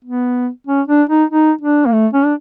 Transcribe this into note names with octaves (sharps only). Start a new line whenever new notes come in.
B3
C#4
D4
D#4
D#4
D4
A#3
A3
C#4
D4